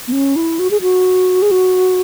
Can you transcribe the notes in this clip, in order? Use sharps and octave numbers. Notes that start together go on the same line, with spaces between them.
B3
C#4
E4
F#4
G#4
F#4
G#4
F#4